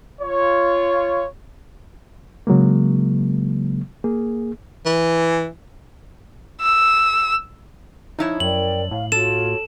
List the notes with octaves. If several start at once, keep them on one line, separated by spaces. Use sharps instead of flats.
F4 C#5
C#3 F#3 G#3 A#3
A#3 G#4
E3
E6
F3 D#4 E4 C#5
F#2 A#4 D5 G5 F#7
A2 F5
F4 F#4 A4 C#5 E7